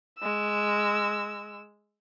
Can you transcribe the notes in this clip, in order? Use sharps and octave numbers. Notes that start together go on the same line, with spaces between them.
G#3 E6